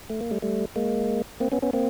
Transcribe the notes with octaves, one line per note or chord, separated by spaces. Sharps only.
A3
A#3
G3 A3
G3 A3
G#3 A#3
A#3 C4
B3 C#4
B3 C#4
A#3 C4